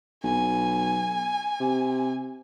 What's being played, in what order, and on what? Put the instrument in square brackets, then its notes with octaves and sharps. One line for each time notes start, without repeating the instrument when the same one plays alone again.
[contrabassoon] B1 [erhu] G#5
[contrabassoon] C3